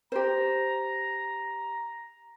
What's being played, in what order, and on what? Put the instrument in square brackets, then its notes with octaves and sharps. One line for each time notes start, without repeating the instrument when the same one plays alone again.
[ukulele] G4 C5 [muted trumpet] A#5